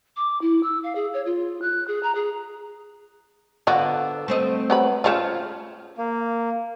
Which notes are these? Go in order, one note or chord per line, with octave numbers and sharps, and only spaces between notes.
D6
E4
E6
F5
G#4
C#5
F4
F#6
G#4
A#5
G#4
D3 F3 B3 F#4
A3 C4 D#5
F#3 B4 B5
C#3 F3 F4 C#5 E5
A#3